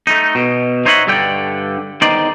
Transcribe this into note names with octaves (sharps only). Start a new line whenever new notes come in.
A3 D#4
B2
D#4 C5 C#5 D#5 E5 F#5
G2 D3 A4 D5 G5
E2 D#3 D#4 C5 D5